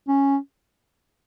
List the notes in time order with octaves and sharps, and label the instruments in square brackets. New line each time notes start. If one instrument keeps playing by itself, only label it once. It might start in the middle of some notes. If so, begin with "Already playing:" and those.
[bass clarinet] C#4